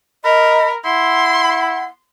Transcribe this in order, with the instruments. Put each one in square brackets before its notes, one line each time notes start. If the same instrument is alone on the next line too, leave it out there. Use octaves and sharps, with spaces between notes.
[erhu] A#4 [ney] D#5 [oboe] B5
[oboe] E4 [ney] F#5 [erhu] C6